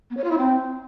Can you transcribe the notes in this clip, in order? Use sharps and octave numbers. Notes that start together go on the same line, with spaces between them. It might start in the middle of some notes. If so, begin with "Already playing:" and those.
B3
C#5
F4
E4
C4